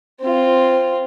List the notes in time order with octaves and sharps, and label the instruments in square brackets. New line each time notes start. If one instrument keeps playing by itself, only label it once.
[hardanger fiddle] C4 F4